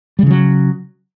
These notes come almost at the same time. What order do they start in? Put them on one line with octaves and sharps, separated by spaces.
G3 C#3 E3 F#3